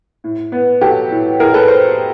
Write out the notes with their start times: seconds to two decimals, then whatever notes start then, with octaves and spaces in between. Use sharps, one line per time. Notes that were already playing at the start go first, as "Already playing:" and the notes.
0.24 A2
0.52 B3
0.81 F#3 G4 A4
1.11 A2
1.40 A2 G#4 A#4
1.54 A4 B4
1.68 C5